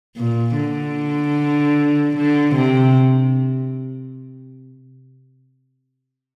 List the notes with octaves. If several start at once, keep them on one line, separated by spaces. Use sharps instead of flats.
A#2
D3
D3
C3